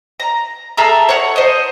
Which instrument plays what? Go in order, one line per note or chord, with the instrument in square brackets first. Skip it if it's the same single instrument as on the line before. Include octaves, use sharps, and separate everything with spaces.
[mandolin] A#5
G#4 A4 E5 A#5
C#5 F#5
C5 D#5